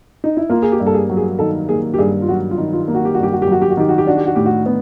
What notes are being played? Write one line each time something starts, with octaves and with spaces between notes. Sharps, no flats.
D#4
E4
A#3 F4
G#4
G4
G2
A4
G#4
F#3
G#4
D#3 A4
A#3 G#4
G4
G2 G#4
F4
F#3 F#4
F4
D#3
F4
A#3
F#4
G4
G2 F#4
G4
F#4
G4
F#3 F#4
G4
F#4
D#3 G4
F#4
G4
D4 F#4
G4
F#4
A2 G4
F#4
B3